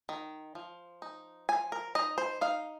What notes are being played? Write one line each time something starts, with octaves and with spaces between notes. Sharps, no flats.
D#3
F3
D#4
F3 G#5
A#4
D#4 D#5
C5
D#4 F5